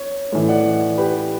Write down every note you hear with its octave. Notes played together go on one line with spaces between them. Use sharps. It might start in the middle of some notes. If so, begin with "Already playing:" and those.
Already playing: C#5
A2 E3
D5 F#5
G4 B4